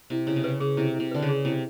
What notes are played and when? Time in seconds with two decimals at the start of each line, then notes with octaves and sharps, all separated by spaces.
0.10 C3 E4
0.27 C#3 E4
0.36 C3
0.44 C#3 B4
0.60 C#3 G#4
0.77 C3 E4
0.94 E4
1.00 C3
1.11 D3 B4
1.22 C#3
1.29 G#4
1.45 C3 E4